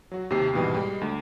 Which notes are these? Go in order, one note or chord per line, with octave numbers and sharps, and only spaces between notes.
F#3 F#4
D#2 C3 G4 C7
D#2 G#2 B2 E3 G3
G3 G#3
D2